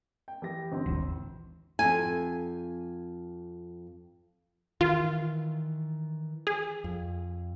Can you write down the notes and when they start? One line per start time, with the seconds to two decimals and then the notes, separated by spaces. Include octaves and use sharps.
0.28 G5
0.42 E3 G4 A#6
0.72 G1 E3 C4
0.86 D#1 G#1 D#2
1.79 F2 G#5
4.81 D#3 E3 F4
6.47 G#4
6.84 F2